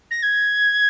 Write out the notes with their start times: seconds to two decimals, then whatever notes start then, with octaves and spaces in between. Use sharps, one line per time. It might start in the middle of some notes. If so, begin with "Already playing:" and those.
0.11 A#6
0.23 G#6